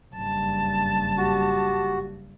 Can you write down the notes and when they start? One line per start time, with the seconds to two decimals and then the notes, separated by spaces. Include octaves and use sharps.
0.15 F#1 G2 A5
1.17 F#4 G4